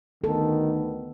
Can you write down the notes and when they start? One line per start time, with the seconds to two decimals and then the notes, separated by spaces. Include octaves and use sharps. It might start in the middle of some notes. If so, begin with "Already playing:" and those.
0.24 D2 D#3 B3 A4